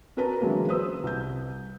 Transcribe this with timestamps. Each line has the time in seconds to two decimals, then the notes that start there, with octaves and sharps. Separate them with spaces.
0.17 C#4 F#4 A#4 B4 A5 A#5
0.41 D3 E3 F#3 G#3 A#3 C#4
0.69 B4 C5 D#6 E6
1.03 C2 G6